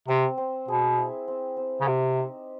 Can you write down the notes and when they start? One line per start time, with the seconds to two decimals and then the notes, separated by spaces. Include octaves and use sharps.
0.08 C3 C4
0.38 C4
0.68 B2 G#4
0.98 E4
1.28 C4
1.57 C4
1.81 C#3
1.87 C3 G4
2.17 D#4